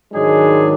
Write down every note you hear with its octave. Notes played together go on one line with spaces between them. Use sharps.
G#2 D#3 F#3 G#3 D4 G#4